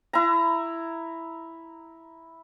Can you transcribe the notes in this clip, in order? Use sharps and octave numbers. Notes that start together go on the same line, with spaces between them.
E4 A#5